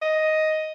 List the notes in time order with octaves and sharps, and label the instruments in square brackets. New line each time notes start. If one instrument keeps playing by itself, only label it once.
[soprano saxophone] D#5